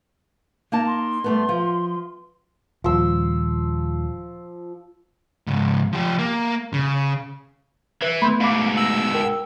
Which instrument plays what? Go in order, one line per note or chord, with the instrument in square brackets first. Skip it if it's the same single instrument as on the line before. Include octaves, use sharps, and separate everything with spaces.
[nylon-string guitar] A#3 D#4 A5
[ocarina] C6
[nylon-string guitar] G3 A3 B3
F3
[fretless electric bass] D#1 [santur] F3 E6
[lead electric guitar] C#2 G#2
F3 G4
A#3
C#3
[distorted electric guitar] E3 [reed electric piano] B4
[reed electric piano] A3 B3 [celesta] B5 C6 G6
[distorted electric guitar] G#2 B2 [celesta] F5 B5 D6
[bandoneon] E6 [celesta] A#6 F#7
[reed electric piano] A#4 [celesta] G5